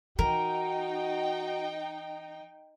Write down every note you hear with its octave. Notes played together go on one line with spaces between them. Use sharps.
E3 D#4 F#4 A#4 G5